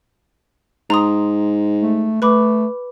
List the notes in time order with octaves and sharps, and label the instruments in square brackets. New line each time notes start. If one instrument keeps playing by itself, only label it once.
[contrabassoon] G#2 [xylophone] A#5 C6 D#6
[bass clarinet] A3
[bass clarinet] A3 [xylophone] B4 B5 D6